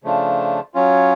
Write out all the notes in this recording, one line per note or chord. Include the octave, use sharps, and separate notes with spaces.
C#3 F3 A3 D4 F4
F#3 C#4 F4